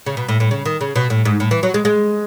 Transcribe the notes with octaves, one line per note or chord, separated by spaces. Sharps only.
C#3
B2
A2
A2
C#3
D#3
C#3
B2
A2
G#2
A2
E3
F#3
G#3
G#3